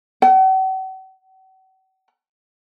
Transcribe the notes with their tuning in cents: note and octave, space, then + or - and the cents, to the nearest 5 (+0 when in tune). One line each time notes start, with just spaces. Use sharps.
F#5 +45